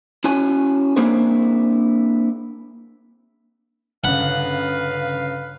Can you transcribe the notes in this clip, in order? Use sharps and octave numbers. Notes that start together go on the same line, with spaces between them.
C#4 E4 F#4 C#5 G#5
A#3 C4 D4 E4 G#4 C5
G1 C#3 B4 F5 F#5